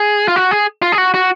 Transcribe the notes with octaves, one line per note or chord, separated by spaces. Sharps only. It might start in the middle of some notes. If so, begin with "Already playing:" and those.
Already playing: G#4
F4
F#4
G#4
F4
G#4
F#4
F#4